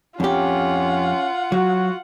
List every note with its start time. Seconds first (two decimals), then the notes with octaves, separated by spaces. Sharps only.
0.20 F2 C#4 F4 G4 F#5
1.52 F#3 F#4